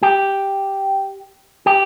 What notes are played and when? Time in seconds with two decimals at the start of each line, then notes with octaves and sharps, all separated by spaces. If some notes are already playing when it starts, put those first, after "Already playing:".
0.03 G4
1.66 G4